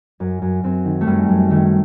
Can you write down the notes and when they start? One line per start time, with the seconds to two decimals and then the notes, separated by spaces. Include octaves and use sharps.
0.20 F#2
0.42 F#2
0.64 F#2 C4
0.85 D#3
1.01 A3
1.07 F#2 G3
1.29 F#2
1.50 D#3 A3